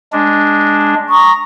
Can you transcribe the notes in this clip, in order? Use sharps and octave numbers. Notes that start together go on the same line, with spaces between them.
G#3 D4
A#5 C#6 D#6